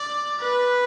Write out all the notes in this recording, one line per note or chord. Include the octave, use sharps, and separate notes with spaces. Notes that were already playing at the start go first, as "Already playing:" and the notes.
Already playing: D5
B4